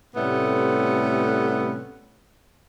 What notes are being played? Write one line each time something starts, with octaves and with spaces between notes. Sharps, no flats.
A2 C3 G3 A3 B3 C#4